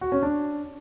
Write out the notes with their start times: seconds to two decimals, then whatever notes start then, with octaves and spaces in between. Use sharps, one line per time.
0.01 F#4
0.12 C#4
0.23 D4